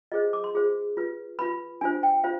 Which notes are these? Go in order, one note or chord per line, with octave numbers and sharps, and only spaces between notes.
F4 G#4 C5 D#5
D6
C6
F4 G#4 C5
F4 B4
F4 B4 B5
D4 F4 C5 G#5
G5
F4 C5 F5